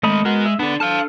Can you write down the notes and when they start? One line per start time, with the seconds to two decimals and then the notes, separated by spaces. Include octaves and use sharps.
0.03 D#3 G#3 A3 D#5 B5
0.25 G#3 B3 F#4 A#4
0.46 E5
0.59 B3 D4 A4
0.80 D4 A4 F5 A5 F6